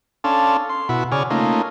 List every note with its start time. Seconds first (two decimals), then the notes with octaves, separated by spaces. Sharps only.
0.24 C#4 D4 A4 F5 A5 C6
0.69 C6
0.89 B2 E4 F#4 B5
1.12 C#3 G#4 C#5 D5 F6
1.30 A3 A#3 C#4 D#4 F4